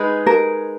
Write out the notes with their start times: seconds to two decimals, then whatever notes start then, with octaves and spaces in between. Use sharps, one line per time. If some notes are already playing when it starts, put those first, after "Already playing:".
Already playing: G#3 D#4 G#4 B4
0.27 A#4